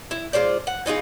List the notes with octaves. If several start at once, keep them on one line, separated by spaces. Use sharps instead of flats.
E4
G#3 F4 C5 D5
F#5
E3 D#4 F4 G#4